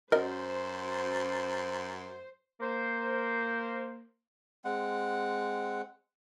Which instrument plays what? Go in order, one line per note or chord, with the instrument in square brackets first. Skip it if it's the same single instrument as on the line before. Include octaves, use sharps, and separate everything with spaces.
[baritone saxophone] F#2 [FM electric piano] C#4 F#4 [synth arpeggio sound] A#4 D#5 [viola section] C5
[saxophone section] A#3 C5
[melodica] G#3 C4 F#5